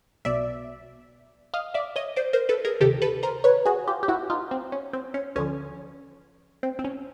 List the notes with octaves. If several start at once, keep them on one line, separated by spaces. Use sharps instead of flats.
B1 B2 D5 E5
D#5 F5
D5 E5
C#5 D#5
C5 D5
A#4 C5
A4 B4
G#4 A#4
D2 C3 D#3 G4 A4
A4 B4
A#4 C5
B4 C#5
F#4 G#4
F4 G4
G4
E4 F#4
D#4 F4
C4
C#4
C4
C#4
D2 D3 F3 C#4
C4
C4
C#4